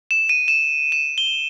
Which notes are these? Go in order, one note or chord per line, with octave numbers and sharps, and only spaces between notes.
E7
D#7
E7
E7
G7